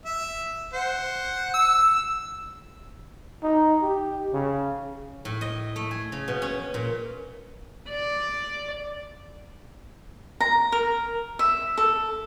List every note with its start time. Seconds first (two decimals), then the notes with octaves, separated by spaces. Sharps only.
0.05 E5
0.73 C5 F#5
1.54 E6
3.43 D#4
3.82 G4
4.33 C#3
5.25 A2
5.41 D#5
5.76 A3
5.91 G#4
6.12 C#3
6.28 B2
6.42 C#4
6.74 A#2
7.89 D5
10.41 A#5
10.72 A#4
11.39 E5
11.78 A4